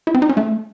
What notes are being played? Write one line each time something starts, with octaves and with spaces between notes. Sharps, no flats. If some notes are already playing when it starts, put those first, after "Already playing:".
E4
C4
D#4
C#4
A3